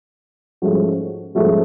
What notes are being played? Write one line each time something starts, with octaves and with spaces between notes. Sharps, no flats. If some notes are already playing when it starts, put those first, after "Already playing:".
G#2 F3 A3 C#4 F#4
G#2 F3 A3 C#4 F#4